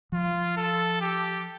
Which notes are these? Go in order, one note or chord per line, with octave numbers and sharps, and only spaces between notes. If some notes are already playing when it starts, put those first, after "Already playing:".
F3 F4
A4
G4